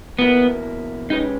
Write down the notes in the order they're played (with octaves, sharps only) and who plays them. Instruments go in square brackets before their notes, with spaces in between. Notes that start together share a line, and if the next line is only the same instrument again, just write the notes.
[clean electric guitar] E2 B2 A#3 E4 [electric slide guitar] B3
[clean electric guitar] C#3 G#3 C#4 G4 B4 [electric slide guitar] D#4